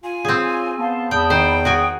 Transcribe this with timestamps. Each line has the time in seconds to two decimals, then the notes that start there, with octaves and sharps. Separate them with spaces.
0.04 F4 G#5
0.25 C4 G#4 C#5
0.78 B3 F5 A5 C6
1.11 E2 G5 A5 B5 D#6
1.30 D#3 C5 G5
1.65 F#4 G#4 G#5 D#6